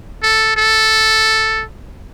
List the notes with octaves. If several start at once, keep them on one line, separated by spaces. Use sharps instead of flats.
A4
A4